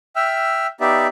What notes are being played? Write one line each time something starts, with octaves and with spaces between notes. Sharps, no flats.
E5 G5 E6 F6
B3 D#4 G4 D5 E5